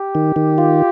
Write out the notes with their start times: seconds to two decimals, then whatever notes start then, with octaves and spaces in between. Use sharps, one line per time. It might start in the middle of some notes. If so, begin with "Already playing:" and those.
Already playing: G4
0.15 D#3
0.36 D#3
0.58 F4